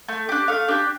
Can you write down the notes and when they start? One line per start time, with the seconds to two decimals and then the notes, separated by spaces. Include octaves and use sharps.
0.09 A3
0.29 D4 G4
0.48 A3 F5
0.68 D4 G4